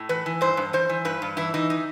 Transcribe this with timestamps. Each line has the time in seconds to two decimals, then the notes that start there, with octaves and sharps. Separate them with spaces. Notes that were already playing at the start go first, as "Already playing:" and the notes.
Already playing: A2
0.09 E3 B4
0.26 E3
0.41 G2 C5
0.57 G2
0.73 E3 C5
0.89 E3
1.05 G2 B4
1.22 G2
1.37 E3 E4
1.54 E3 D#4
1.70 D#4